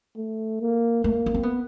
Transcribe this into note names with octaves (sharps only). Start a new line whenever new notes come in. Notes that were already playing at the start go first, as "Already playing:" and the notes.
A3
A#3
A3 A#3
B3
C4
B3